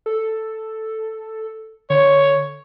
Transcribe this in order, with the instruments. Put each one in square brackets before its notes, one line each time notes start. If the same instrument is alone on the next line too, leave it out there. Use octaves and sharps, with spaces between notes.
[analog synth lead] A4
[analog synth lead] D3 [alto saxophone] C#5